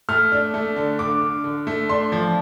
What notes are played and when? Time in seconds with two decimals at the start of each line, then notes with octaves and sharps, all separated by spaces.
0.09 A3 F6
0.32 D4
0.54 A3
0.76 D3
0.99 D3 D6
1.21 D3
1.44 D3
1.67 A3
1.89 D4 C6
2.12 F3